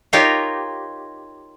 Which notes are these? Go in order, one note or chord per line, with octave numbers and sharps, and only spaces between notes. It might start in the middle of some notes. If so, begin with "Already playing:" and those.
D#4 F4 G4 A#4 C#5 F5